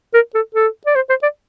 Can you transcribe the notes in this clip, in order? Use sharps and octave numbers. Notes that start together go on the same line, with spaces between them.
A#4
A4
A4
D5
C5
C5
D5